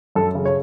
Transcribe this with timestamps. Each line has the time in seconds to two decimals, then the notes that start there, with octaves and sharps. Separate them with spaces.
0.15 F#2 A4
0.35 C#3
0.45 C#5